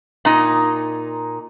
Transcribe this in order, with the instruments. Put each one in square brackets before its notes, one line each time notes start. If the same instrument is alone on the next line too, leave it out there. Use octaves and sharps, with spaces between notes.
[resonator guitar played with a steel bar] A#2 D#4